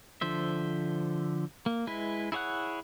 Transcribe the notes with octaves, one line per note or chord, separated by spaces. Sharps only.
D3 F3 C5 E5
A#3
G#3 E4 B4
E4 G#4 C#5 F#5 F#6